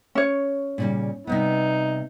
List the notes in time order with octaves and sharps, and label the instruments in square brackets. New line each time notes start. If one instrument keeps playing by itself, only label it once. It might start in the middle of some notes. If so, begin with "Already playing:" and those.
[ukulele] C#4 C#5
[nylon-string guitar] A#2 C#3 G3
[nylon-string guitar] C3 G3 B3 [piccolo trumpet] D#4